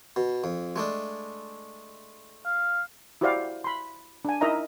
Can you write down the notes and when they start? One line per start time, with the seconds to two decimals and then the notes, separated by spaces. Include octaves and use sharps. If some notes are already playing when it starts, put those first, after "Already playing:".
0.16 B2
0.44 F2
0.76 G#3 A3 D4
2.46 F5
3.21 E4 F#4 G4 C5 D5 F5
3.64 B5 C6
4.25 D4 G#5
4.41 D#4 E4 A#4 D#5 E5 A#5